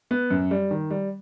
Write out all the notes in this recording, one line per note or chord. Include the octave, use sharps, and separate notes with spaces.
B3
F#2
G3
D#3
G3